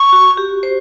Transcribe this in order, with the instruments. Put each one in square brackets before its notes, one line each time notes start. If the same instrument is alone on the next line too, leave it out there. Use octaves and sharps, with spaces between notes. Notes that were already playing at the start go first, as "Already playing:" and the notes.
Already playing: [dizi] C#6
[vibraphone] F#4
G4
C5